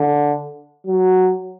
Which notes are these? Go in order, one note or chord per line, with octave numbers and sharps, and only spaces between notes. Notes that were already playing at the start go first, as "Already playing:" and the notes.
Already playing: D3
F#3